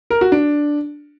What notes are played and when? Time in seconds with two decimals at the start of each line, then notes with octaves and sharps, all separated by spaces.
0.10 A#4
0.21 F#4
0.32 D4